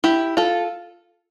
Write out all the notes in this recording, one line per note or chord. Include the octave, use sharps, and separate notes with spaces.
E4 G4
F4 A4